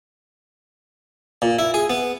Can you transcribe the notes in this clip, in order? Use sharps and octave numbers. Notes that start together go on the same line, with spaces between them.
A#2
E4
G#4
B3